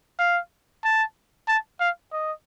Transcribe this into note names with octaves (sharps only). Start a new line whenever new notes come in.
F5
A5
A5
F5
D#5